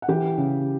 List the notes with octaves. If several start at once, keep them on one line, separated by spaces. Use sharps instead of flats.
F#5
E3 G4 G5
C#3